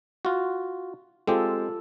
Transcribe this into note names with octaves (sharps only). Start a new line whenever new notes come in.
F4 F#4
G#3 C4 F4 G4 A4